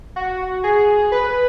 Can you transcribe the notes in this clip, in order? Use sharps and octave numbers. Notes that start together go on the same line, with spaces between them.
F#4
G#4
B4